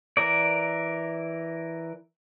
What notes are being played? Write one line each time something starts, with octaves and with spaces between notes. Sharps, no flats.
E3 A#4 D5